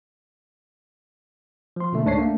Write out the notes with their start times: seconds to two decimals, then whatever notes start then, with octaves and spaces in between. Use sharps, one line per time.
1.76 F3 C6
1.92 B2 D3 A3
2.04 C#2 G#2 D4 C#5 C7
2.18 A3 A#3 D4